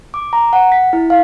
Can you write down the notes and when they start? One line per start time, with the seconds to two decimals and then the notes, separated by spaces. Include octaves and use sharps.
0.14 D6
0.33 A#5
0.53 F#5
0.72 B6
0.93 E4
1.10 F5